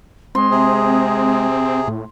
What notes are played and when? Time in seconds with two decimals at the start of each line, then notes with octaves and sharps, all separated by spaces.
0.35 G#3 C4 C6
0.51 C3 G#4
1.88 A2